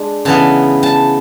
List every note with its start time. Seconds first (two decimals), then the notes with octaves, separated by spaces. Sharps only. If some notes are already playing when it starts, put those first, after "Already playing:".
Already playing: G#3 D4
0.25 C#3 E3 B3 A5
0.83 A5